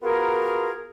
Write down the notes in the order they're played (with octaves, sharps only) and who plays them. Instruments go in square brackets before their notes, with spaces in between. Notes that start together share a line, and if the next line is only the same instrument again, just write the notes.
[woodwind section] B3 F4 F#4 G#4 A#4